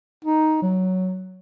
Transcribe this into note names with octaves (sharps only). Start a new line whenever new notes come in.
D#4
F#3